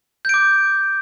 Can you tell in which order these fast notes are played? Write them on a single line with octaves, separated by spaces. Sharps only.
G6 D7 D6